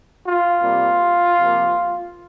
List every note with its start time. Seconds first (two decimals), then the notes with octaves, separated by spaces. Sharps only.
0.25 F4
0.63 C3 G3 A#3
1.39 C3 F3 A#3